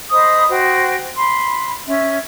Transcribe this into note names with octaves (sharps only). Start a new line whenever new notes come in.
C5 D#5 B5 D#6
F#4 C5 G5
B5 C6
C#4 E5